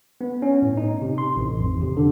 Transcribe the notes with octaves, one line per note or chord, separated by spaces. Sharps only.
B3
C#4
A2
D#4
C3
C6
A1
F2
C3
D3